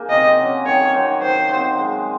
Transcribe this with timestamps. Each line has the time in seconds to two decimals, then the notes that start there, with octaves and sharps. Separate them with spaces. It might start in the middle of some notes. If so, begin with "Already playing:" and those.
Already playing: A#3 D#4 G#4
0.10 C3 D#5
0.38 F#3 C#4
0.65 D#3 C#5
0.94 F#3 C4 D#4
1.22 D#3 C5
1.50 F#3 C4 D#4
1.78 G#3